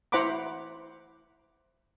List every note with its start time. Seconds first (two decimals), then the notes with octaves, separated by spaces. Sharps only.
0.12 E4 C5 F#5 A#5 B5 D6